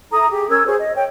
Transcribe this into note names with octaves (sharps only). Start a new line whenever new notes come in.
E4 A4 A#5 D#6
G4 G#4
C#4 A#4 E6 G#6
F#4 G#4 C5 C#5
D#5
C#5 G5